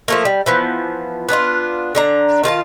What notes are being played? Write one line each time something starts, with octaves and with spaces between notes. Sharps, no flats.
F3 A3 A#3
G3
E3 F3 B3
B3 D4 D#4 F4
D3 D4 A#5
D#3 F4 F5 A5